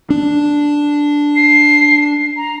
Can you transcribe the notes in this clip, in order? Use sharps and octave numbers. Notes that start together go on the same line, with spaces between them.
D4
C7
A#5